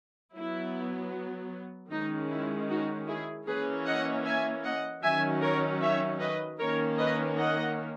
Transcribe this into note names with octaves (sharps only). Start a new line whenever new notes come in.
F#3 B3 E4
D#3 G#3 C#4 D#4
E4
D#4 F#4
E4 G#4
E3 A#3 C#4 G#4 B4
D#5 F#5
E5 G#5
D#5 F#5
D#3 F#3 C#4 E5 G#5
A#4 C#5
C#5 E5
B4 D#5
D#3 A#3 C#4 A#4 C#5
B4 D#5
D#5 F#5